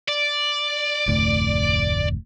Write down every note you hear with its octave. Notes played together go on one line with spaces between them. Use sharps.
D5
F1 D2 A2